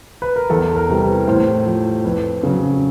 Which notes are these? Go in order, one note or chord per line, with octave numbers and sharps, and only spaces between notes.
B4
A#4
E2 A4
A#4
C3 E3 G3
B4
A2 C5
F3
F2 B4
C#3 F#3